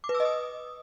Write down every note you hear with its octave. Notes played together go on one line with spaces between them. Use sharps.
D6
B4
E6
D#5
D#6